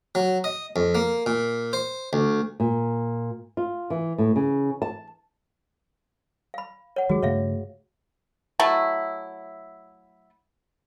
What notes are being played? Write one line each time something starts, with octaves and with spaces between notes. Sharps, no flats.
F#3
D#5
F2
A#3
A#2
C5
D2
A#2
F4
E3
A2
C#3
A5
F5 B5
C#5 F#5
D#3 F#3 G#3 F#4 G#4
G2 C#3 A3 C#5 E5 F5
F#3 A3 E4